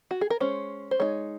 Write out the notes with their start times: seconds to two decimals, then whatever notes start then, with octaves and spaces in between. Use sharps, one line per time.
0.11 F#4
0.21 G#4
0.30 A#4
0.40 G#3 C#4 C5
0.91 C5
1.00 G#3 D#4 C#5